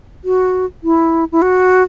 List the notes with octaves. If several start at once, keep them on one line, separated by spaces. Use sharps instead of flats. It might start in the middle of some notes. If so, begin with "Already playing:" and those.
F#4
E4
E4
F#4